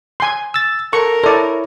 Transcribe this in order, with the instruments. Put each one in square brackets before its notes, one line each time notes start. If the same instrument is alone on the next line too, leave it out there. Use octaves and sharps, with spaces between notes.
[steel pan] G#5 C6
[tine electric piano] E6 A6
[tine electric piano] A4 [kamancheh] A#4 [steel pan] C#6
[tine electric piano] E4 C#5 [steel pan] A4 D5